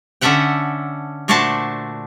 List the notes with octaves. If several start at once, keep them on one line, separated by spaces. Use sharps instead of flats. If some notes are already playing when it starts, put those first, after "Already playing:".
D3 C#4 A4 E5 F#5 G5
A#2 A3 D4 F#4 C5 A5